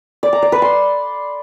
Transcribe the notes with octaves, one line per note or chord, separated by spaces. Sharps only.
D5
A#5
D5
B4
C6